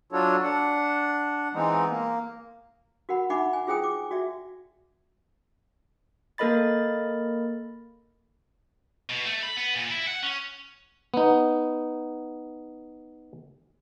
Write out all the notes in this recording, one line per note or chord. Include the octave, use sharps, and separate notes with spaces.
F#3 D4 F4 F#4 A4 C#5
D4 F#5
E3 G#3 B3 C4 D#4
A#3
F#4 A#4 F#5 B5
D#4 E5 F#5 G#5 B5 D6
G#5
F4 G#4 C5 G5 G#5 D#6
D6
F#4 D5 E5
A#3 A4 A#4 D#5 B5 A6
B2
A3
B5
B3
A#2
E4
F#5
C#4
B3 D#4